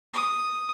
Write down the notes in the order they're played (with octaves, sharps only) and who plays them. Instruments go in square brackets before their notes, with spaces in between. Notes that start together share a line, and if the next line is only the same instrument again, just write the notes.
[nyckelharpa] D#6